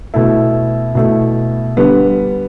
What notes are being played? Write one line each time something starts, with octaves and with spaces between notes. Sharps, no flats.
B2 A3 E4
B2 A3 E4
D3 G3 B3